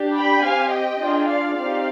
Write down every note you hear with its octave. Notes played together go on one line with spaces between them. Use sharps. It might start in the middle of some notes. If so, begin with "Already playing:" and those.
Already playing: D4 G4
G5 B5
C4 G4 F5 G#5
D#5 G5
D4 F4 G#4
D5 F5
C4 D#4 G4 D5 F5